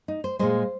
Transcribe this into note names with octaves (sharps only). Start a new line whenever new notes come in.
D#4
C5
A#2 G#3 C5